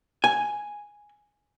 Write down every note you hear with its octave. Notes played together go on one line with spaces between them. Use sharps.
G#5